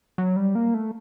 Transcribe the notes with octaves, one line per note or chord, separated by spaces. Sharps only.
F#3
G3
A#3
A3